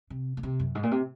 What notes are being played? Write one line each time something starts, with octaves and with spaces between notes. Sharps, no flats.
C3
A#2
C3
F#2
G#2
A#2
C3